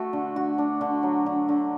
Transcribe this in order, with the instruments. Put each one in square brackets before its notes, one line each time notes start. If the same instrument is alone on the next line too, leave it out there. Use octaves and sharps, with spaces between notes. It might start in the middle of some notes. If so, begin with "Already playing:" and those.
Already playing: [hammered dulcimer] A3 F#4
D3
F#4
D4
D3
F#3
D3
D3